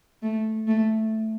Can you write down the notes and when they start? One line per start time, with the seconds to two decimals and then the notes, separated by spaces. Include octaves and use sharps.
0.22 A3
0.67 A3